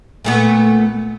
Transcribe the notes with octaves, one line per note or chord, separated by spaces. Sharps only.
A#2 A3 B3